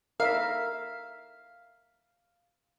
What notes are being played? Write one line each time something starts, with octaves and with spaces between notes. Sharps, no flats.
A#4 E5 F5